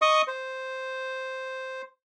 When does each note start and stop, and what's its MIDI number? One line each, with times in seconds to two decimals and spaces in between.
0.02 0.22 75
0.02 0.22 85
0.02 0.22 87
0.27 1.82 72